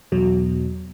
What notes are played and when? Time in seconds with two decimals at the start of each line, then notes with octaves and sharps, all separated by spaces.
0.12 E2 B2 F#3